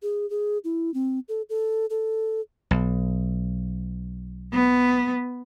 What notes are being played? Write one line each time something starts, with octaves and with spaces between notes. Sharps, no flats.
G#4
G#4
E4
C4
A4
A4
A4
B1
B3